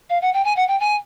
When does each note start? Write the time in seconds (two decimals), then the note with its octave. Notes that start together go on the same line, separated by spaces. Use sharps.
0.10 F5
0.22 F#5
0.33 G5
0.44 G#5
0.56 F#5
0.68 G5
0.80 G#5